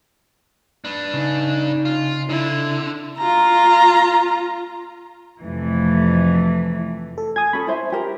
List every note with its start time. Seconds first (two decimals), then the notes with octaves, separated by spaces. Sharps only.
0.84 D4 B4
1.14 C#3 D#4
1.85 F4
2.30 D3 E4
3.18 F4 A#5
5.43 F2 C3 E3 A3
7.18 A4
7.36 G#4 D#6 G#6
7.53 C#4 A4 B5
7.67 E4 C5 E5
7.92 G4 A#4